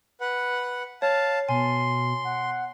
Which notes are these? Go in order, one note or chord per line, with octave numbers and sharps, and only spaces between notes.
B4 F#5
C#5 F5 A5
B2 G#5 C6
F#5